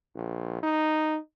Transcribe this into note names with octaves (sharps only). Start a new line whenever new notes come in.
A#1
D#4